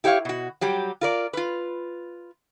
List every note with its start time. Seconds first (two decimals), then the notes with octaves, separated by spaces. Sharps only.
0.04 E4 G4 C#5 D#5 F5
0.25 B2 F#4
0.61 F#3 G3 G4
1.01 F4 A#4 D5
1.33 F4 B4